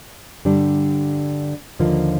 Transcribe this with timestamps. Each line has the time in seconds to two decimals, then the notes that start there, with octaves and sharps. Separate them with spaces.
0.45 G2 D3 G3 D4
1.79 D#2 D3 F3 A#3 F4